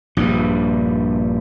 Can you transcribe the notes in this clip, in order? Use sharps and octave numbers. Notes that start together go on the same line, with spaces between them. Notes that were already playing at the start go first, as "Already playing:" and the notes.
A#1 G2